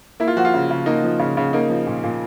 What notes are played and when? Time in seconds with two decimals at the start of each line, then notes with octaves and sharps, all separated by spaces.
0.20 A#3 E4
0.28 F4
0.37 F3 F#4
0.45 F4
0.54 C#3
0.71 C#3
0.86 A#3 D#4
1.04 F3
1.19 C#3
1.37 C#3
1.53 A#3 D#4
1.70 F3
1.87 A#2
2.04 A#2